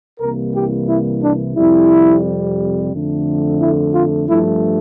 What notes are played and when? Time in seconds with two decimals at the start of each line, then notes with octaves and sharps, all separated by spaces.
0.20 C2 C3 E3 G3 A#3 A#4
0.55 G4
0.88 E4
1.23 D4
1.55 F2 C3 G3 E4
2.92 F2 D3 A3
3.60 E4
3.94 F4
4.28 G2 F3 A3 E4